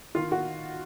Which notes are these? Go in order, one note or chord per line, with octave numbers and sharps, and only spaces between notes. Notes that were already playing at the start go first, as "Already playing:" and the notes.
D#3 F4
F#4